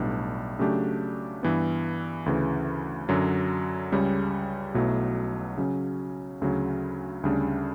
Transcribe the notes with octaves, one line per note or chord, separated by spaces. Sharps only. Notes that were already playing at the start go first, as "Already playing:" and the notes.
Already playing: B1 A2 G3 B3 D4
C#3 F#3 A3 D4 G4
G2 E3 B3
D2 C#3 E3
F#2 D3 F#3
C#2 C#3 G3 C#4
B1 B2 F#3 A3 E4
C#3 F#3 C#4
D2 C#3 F#3
D2 C#3 G3 D4